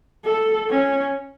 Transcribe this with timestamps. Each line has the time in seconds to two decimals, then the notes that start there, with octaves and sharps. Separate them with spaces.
0.25 A4
0.70 C#4